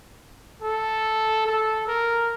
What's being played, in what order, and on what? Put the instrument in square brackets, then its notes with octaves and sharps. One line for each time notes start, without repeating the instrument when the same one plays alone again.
[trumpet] A4
A4
A#4